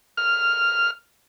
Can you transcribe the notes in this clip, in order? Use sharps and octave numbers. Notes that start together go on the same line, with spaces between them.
F6